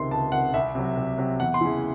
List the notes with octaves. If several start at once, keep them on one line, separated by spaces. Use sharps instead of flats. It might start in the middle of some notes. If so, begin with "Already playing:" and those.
Already playing: C#2 C3 D#3 C6
C#2 A5
C3 D#3 F#5
C2 E5
C3 F#3
C2
C3 F#3
E2 F#5
C6
C#3 E3